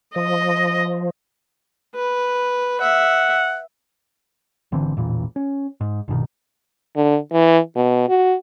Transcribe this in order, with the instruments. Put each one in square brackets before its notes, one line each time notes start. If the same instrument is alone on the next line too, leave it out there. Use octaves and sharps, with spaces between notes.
[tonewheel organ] F3 [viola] D#5
[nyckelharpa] B4
[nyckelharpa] E5 [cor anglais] F#5
[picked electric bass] G#1 D3 E3 C4
A1 E2 A#2 E3
C#4
G#2
A#1 G2 B2 D#3
[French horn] D3
E3
B2
F#4